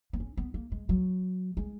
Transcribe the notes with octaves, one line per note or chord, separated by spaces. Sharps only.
B3
C#4
B3
A#3
G#3
F#3
G#3